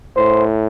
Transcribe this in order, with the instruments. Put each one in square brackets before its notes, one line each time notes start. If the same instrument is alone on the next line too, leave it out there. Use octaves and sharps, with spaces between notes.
[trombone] A2 [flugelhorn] C5